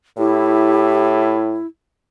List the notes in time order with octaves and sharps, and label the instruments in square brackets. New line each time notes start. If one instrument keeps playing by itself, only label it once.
[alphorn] A2 [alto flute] E4 [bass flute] G4